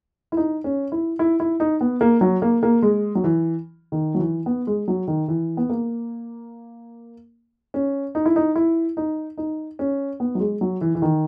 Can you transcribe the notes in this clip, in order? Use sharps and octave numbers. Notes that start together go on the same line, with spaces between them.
E4
D#4
C#4
E4
E4
E4
D#4
B3
A#3
F#3
A#3
A#3
G#3
F#3
E3
D#3
F#3
E3
B3
G#3
F#3
D#3
E3
B3
A#3
C#4
D#4
E4
D#4
E4
D#4
D#4
C#4
B3
F#3
G#3
F#3
E3
E3
D#3